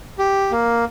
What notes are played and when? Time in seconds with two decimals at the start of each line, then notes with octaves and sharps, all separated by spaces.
0.19 G4
0.52 A#3